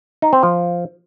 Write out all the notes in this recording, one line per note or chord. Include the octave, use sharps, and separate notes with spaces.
D#4
C4
F3